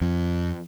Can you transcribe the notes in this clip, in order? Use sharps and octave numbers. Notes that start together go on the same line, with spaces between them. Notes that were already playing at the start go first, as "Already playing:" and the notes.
F2